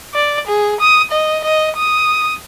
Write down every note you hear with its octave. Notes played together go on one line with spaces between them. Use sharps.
D5
G#4
D#6
D#5
D#5
D#6